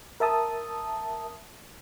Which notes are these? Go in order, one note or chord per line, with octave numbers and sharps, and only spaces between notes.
A#4 E5 A5 D#6